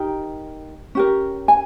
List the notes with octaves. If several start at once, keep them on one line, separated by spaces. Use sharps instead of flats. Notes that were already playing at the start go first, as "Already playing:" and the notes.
Already playing: D#4 G4 A#4 G5
C#4 G4 A#4
G#5